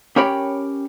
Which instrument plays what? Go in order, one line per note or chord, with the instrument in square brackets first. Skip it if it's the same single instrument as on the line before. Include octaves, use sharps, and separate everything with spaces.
[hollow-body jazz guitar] C#4 G4 A#4 C#5 G5 B5